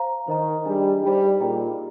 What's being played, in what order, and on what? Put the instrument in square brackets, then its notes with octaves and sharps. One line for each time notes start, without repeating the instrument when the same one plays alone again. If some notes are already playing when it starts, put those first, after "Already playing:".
Already playing: [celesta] C5 F5 A#5
[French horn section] D#3 [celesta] C5 D#5 A#5
[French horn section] G3 [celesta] D4 G#4 D#5 G#5
[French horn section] G3 [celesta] D#4 G4 C5
[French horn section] A#2 [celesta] D#4 G#4 D#5 G5 A#5